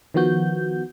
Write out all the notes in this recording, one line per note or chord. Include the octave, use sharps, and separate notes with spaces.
D#3 F3 B3 F#4 G6